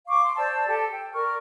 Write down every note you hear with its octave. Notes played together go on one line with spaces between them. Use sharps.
F5 C#6 D6
C6
C5 D5 A5 E6
G4 A4 A5
G5
A#4 D5 C#6 F6